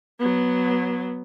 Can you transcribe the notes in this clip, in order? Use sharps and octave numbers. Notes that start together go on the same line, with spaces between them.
F#3 B3